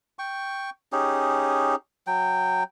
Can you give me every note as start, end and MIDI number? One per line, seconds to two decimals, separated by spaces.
0.19 0.70 79
0.19 0.70 85
0.92 1.75 61
0.92 1.75 63
0.92 1.75 67
0.92 1.75 68
2.07 2.64 54
2.07 2.64 79